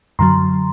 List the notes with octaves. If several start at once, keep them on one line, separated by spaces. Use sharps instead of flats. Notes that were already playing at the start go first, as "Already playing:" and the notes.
F#2 D3 F#3 A#5 C6